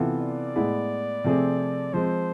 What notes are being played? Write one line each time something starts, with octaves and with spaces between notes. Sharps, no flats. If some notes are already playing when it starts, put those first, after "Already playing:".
Already playing: C3 E3 B3 F4 A4
D5
A2 G#3 B3 E4 G#4
C3 F3 A3 C4 G#4
F3 G#3 C4 C5